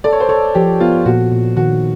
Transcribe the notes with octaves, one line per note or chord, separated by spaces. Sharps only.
A4 D5
C#5
C5
A4 C#5
F3 G4
B3 F4
A#2 F#4
A#2
D#3 F#4